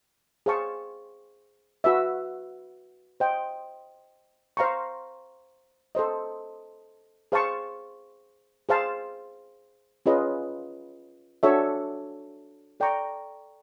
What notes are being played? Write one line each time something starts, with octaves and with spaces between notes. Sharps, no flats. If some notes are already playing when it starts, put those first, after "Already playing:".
G#4 C5 F5 A5 C#6
F#4 B4 E5
C5 D#5 G5
C5 F5 A#5 C#6
A4 C5 D#5
G#4 C5 F5 A5 C#6
G#4 C5 F5 A5
C#4 F4 G#4 B4 D#5
D4 F#4 A4 C#5 E5
A4 D5 G5 A#5 C#6